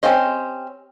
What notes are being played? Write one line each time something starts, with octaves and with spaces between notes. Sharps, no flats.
C4 C#4 G4 C5 D#5